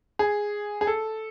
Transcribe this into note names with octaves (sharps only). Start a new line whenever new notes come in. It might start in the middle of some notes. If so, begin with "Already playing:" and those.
G#4
G#4
A4